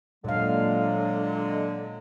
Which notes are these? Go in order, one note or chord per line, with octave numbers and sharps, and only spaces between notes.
A#2 D3 F#3 G#3 F5